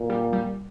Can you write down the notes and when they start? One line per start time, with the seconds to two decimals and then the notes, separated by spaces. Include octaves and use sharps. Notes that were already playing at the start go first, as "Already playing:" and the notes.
Already playing: A#2
0.10 G3
0.33 G3